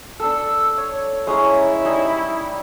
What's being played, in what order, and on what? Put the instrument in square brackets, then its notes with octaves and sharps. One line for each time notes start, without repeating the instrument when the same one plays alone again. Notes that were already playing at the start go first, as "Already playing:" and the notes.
[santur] D4 A4 [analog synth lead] E6
[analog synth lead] C#5
[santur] G#3 C#4 A#5 [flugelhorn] E4
[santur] G3 D#4 D#5